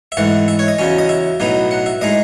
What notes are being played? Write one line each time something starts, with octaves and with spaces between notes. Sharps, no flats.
E5
G#2 E3 A3 F#5
E5
C#5
D#5
E2 C#3 F#3 C#4
D#5
E5
B1 A2 F#3 B3 D#4
F#5
E5
A2 G#3 D#4 D#5